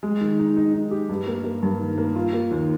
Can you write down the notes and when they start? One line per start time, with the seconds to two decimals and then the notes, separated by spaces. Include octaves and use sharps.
0.03 G#3
0.21 D#3
0.39 D#4
0.56 D#4
0.74 D#4
0.91 G4
1.09 G2
1.27 A#3
1.44 A#3
1.63 G2
1.79 D#3
1.98 A#3
2.15 F4
2.33 A#3
2.51 D#2